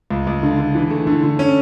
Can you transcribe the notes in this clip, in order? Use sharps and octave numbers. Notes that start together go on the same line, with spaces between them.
C#2
C#2
D3
D3
E3
A3
D3
D3
C#4